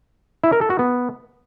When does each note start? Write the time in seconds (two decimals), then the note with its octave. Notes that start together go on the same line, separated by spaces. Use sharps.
0.44 E4
0.52 A#4
0.61 A4
0.70 F#4
0.79 B3